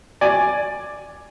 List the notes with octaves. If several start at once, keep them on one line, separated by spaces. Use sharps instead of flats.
D5 G#5